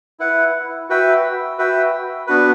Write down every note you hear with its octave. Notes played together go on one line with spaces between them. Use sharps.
E4 B4 F#5
F#4 B4 E5 G5
F#4 B4 E5 G5
B3 D4 F#4 B4